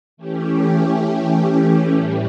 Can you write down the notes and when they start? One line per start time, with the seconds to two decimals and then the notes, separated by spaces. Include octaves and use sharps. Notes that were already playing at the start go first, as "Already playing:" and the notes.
0.17 E3 A3 C#4 G4
1.92 A2 E3 G3